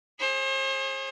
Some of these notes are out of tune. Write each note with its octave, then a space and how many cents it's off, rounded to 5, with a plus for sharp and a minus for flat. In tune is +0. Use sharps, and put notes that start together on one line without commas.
G#4 +0 C5 +40